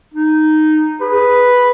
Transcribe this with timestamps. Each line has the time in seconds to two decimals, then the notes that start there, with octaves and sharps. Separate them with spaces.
0.14 D#4
1.01 G#4 B4